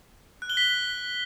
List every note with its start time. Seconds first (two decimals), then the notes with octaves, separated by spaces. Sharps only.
0.42 F#6
0.50 G7
0.57 B6